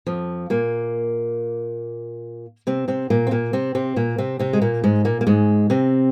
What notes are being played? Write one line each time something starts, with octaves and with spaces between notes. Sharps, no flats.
F2 F3
A#2 A#3
C3 C4
C3 C4
A#2 A#3
C4
A#2 A#3
C3 C4
C3 C4
A#2 A#3
C3 C4
C3 C4
G#3
A#2 A#3
G#2 G#3
A#2 A#3
A#3
G#2 G#3
C3 C4